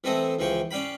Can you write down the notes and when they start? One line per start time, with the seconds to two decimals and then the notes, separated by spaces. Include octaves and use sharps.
0.04 E3 A3 C4 A4 D#5 D#6
0.39 C#2 E3 F3 G5 C#6
0.71 C#4 D5 F5 G5 B5